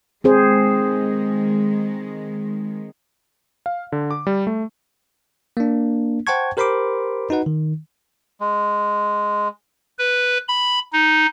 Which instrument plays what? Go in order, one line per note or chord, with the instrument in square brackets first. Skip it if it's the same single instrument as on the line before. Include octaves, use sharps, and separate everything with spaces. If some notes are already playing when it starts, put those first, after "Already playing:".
[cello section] D#3 G#3 [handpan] C4 G#4 C5
[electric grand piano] F5
D3
D6
G3
A3
[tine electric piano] A#3 D4
C5 F#5 G5 A5 C#6 G#6
G4 A#4 C5 B5 C6 D6
D#4 F#4 B4 F#5
D#3
[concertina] G#3
[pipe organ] B4
B5
D#4